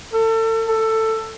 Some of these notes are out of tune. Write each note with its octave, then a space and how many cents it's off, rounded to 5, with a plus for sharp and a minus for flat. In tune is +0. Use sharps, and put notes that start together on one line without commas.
A4 +35
A4 +15